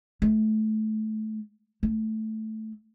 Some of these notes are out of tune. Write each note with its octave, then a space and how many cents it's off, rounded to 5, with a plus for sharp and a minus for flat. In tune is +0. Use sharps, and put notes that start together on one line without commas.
A3 -20
A3 -5